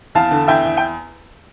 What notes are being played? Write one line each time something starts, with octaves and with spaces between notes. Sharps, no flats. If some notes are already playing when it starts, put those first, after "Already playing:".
E2 F5 A5
D3
E2 E5 G5
E2
G5